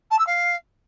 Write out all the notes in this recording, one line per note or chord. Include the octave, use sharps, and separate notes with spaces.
A5
E6
F5